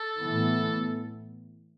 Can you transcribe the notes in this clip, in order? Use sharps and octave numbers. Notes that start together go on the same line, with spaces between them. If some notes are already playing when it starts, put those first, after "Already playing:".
Already playing: A4
A2 E3 B3